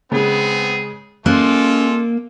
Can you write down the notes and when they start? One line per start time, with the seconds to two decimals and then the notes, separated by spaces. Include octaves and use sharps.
0.12 C#3 G#3 B3 C4 G#4
1.26 G#3 A#3 C#4 F4 A4 F#6